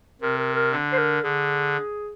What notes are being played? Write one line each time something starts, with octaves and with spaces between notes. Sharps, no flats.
C3 A#4
A#4
A#4
D3
C5
A#4
D3 G#4